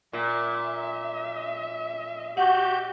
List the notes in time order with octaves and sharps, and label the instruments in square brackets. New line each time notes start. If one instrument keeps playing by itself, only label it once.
[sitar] A#2 [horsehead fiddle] E5
[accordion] F#4 G4 G6 [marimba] F#5